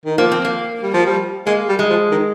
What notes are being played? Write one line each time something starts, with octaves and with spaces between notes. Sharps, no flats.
D#3
F3 A#3
C4
A#3
G3
F3
G3
G#3 A#3
G3
G#3
F3
D#3